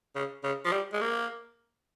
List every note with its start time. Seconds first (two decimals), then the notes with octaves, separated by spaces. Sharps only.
0.15 C#3
0.44 C#3
0.65 F3
0.72 G3
0.93 G#3
1.01 A#3